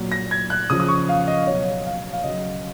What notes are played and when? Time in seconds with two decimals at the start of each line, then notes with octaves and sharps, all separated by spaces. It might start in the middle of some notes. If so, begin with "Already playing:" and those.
Already playing: A#2 F#3
0.12 A#6
0.31 G#6
0.50 F#6
0.70 C#3 F3 D#6
0.80 D#6
0.88 C#6
1.09 F5
1.27 D#5
1.47 B2 F#3 C#5
1.86 F5
2.13 F5
2.24 C#3 F#3 D#5